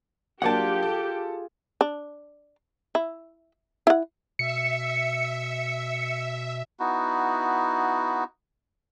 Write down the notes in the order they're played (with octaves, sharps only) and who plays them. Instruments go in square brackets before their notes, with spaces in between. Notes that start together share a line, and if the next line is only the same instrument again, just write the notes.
[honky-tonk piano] F#3 A#3 D4 [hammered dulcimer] F4 G#4 [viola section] G4 [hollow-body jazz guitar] F#5 A5
[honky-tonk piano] A4
[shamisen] D4
E4
E4 F#5
[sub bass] B2 [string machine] E5 [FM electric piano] C#7
[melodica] B3 D#4 E4 F#4